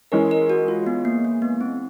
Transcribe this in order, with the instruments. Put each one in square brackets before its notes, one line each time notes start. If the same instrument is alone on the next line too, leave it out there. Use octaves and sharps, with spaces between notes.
[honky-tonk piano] E3 G#3 C#4 [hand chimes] A#4
[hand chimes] A#4
F#4
F4
B3
A#3
A#3
B3
C4